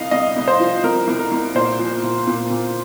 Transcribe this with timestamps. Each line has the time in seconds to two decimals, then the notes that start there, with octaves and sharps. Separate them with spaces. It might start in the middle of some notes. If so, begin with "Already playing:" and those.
Already playing: C2 D#5 F5
0.11 C2 D#5
0.36 C2
0.48 C5
0.60 F3
0.84 C2 A#4
1.08 C2
1.19 A#4
1.32 C2
1.55 A#2 C5
1.79 F3
2.03 A#2
2.27 A#2
2.50 A#2